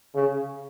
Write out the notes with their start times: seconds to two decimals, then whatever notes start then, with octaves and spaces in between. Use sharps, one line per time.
0.14 C#3